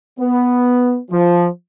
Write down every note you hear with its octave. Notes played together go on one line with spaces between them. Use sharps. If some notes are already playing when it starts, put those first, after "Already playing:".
B3
F3